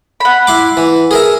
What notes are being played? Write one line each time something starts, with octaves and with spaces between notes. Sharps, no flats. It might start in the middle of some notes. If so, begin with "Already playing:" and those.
F#5 B5
E4 C6 D6
E3
G#4 A#4 E5